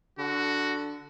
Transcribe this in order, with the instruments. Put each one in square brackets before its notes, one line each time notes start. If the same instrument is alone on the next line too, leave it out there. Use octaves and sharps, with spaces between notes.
[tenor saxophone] D3 [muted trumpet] F#4